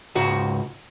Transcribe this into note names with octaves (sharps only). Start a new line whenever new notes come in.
C#2 G#2 F#4